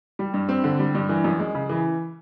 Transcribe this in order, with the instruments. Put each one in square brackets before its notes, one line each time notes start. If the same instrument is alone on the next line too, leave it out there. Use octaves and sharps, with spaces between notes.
[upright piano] G3
G2
C4
D3
G3
G2
E3
F#2
G#3
C#3
E3